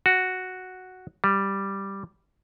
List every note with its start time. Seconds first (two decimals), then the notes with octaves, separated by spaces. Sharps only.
0.06 F#4
1.24 G3